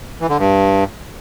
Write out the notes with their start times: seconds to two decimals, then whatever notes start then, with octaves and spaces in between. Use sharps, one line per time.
0.21 E3
0.29 D3
0.38 G2